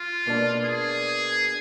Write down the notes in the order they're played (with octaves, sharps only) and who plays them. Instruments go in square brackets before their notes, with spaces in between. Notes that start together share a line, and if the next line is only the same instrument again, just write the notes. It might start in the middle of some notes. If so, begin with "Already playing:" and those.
Already playing: [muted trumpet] F4
[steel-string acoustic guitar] B2 A#3 D4
[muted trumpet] G#4